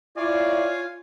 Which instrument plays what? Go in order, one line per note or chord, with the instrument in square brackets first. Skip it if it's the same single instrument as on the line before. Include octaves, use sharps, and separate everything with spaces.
[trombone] E4 [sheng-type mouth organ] F4 F5 G#5 [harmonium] C#5 [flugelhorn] D5